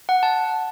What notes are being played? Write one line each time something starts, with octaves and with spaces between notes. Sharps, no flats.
F#5
A5